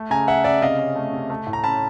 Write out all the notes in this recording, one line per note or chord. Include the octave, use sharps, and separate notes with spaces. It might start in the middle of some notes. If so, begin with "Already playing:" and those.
Already playing: A3
C#3 G#5 A#5
A3 E5 F#5
C#3 D5 E5
C3 D#5 F5
C#4
A3
C3
A3
A2
A#5
C#4 A5 B5